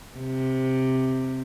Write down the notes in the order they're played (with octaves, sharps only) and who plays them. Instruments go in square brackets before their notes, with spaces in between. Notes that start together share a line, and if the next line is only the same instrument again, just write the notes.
[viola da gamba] C3